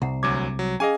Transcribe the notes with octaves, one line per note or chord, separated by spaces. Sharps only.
C2 F#5 A#5
D2 F#3 D6 G#6
F#3
C#4 G#4 D#5 F5 G#5